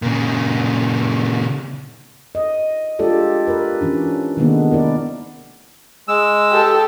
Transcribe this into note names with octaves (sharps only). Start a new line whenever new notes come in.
A#2 C#3
D#5
G#3 D4 F4 G4 A4 D5
A#4 B4
E3 C#4 D4
C3 D#3 G#3 A#3 B3 D4
E4 A#4 D5
G#3 E6
G4 A4